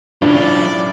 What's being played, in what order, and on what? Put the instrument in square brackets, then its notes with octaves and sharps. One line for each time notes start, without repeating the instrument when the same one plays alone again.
[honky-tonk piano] B1 A2 C#3 [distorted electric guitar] F#3 F4 [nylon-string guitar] D4 [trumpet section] D5